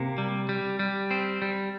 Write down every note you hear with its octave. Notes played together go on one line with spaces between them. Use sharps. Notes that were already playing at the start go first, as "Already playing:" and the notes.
Already playing: C3 A#3
G3
G3
G3
C4
G3